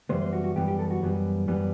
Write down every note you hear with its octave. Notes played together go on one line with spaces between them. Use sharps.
F#2 E3 G3 B3 C5
C5
F#4
F#4
F#2 E3 G3 B3 G4
G4
A4
F#4
F#2 E3 G3 B3
F#2 E3 G3 B3